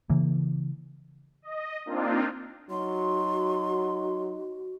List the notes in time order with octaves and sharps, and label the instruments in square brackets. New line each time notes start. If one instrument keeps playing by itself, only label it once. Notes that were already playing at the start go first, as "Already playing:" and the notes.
[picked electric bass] C#3 E3 A#3
[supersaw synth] D#5
A#3 C4 D4 D#4 F4
[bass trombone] F#3 [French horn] D#4 [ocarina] F#4 [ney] C6